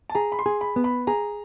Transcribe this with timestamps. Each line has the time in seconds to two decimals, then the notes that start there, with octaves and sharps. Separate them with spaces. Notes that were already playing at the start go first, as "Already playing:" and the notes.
0.10 A5
0.15 G#4 A#5
0.32 B5
0.39 C6
0.46 G#4
0.61 B5
0.76 B3
0.84 B5
1.07 G#4 A#5